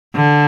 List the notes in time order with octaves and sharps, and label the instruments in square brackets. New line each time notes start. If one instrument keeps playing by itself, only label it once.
[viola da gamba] D3